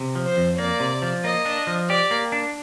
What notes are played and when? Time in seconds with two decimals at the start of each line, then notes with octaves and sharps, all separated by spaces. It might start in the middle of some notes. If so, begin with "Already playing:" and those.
Already playing: C3
0.15 F3
0.26 C5
0.37 F2
0.58 A#3 D5
0.80 C3
1.02 F3
1.24 A#3 D#5
1.45 D4
1.67 F3
1.89 G4 D5
2.11 A#3
2.32 D4